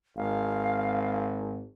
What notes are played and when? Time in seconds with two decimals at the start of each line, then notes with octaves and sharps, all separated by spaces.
0.17 G#1 F5